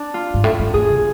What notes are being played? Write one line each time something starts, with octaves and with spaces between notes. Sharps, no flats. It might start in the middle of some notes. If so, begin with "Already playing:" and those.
Already playing: D4
F4
G#2
A2
G#2
A2 G#4
C3